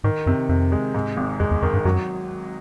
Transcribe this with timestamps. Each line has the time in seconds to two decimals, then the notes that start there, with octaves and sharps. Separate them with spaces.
0.04 G#2 D#3
0.26 F#2 C3
0.49 F2 C3
0.72 G#3
0.95 G#2
1.17 G#1
1.40 F2 G#3
1.51 E2
1.62 F2 D#3
1.73 G2
1.85 F#2 F#3